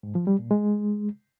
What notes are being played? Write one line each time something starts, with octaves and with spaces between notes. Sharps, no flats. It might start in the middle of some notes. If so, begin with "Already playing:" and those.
G#2
F3
G3
A#2
G#3